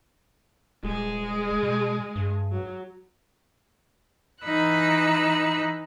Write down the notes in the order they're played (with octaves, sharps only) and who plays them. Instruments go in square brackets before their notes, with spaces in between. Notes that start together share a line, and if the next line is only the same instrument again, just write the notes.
[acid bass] D#1 [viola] G#3 G#4
[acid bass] B2
G2
[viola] F#3
[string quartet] E3 D#4 B5 E6 F#6